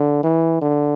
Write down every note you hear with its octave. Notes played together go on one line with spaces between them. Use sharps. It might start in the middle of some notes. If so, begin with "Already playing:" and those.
Already playing: D3
E3
D3